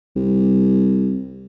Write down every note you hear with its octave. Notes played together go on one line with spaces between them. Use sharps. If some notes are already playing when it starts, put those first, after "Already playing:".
C2